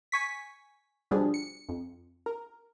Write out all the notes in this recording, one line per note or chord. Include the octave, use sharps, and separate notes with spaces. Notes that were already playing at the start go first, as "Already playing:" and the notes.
G#5 C#6 B6
B2 D3 F3 G3 D4 G#4
C#7
F2
A#4